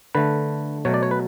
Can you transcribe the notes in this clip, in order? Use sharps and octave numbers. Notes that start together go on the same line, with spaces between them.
D3 A3 B4
B2 F#3 A3 C#5
D5
C#5
B4